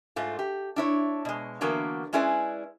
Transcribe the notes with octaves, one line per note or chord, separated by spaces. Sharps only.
G#2 A3 F4
G4
D4 E4 C#5
B2 G#3
D3 E3 F#3 A#3 B3
G#3 C#4 E4 G#4 B4 D5